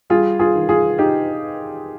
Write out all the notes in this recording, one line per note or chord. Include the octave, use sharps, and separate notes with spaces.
G3 F4 G#4
F4 G#4
D#3
F4 G#4
D#4 G4